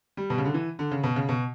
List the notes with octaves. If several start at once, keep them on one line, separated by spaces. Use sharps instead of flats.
G3
B2
C#3
D3
E3
D3
C#3
B2
C#3
B2